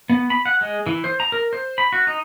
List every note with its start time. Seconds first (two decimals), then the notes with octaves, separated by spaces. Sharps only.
0.09 B3
0.30 B5
0.46 F#5
0.61 G#3
0.86 E3
1.04 C5
1.20 A#5
1.32 A#4
1.53 C5
1.78 B5
1.93 F#4
2.07 D#4